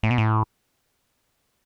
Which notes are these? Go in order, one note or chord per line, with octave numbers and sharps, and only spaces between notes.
A2
B2
A2